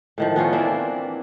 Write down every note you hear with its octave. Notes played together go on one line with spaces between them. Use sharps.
A2 D#3 F3
B3 C#4 F4 C#5
E3 A#3 C4 D4